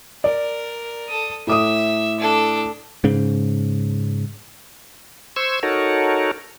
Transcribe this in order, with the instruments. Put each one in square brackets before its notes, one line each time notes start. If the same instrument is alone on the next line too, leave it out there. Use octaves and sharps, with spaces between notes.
[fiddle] A#4 [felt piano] D5
[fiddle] A4 D#6
[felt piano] A2 D6 D#6 [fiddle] E5
[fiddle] D4 A4
[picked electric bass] G#2 C#3
[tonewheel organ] C5 C#6 E6 G#6
D#4 F#4 A4 A#4 C#5